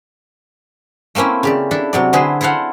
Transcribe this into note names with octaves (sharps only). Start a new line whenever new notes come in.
A3 A#3 C4 C#4 E4
C#3 G4 D5
D4 E4 A4
C3 F#3 D5
D3 C4 E4 G#4 B4 C5
E4 A4 C5 F5 F#5